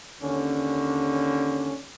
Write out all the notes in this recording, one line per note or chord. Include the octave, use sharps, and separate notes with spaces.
D#2 D3 C#4